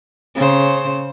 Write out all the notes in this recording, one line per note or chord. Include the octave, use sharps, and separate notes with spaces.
C#3 C5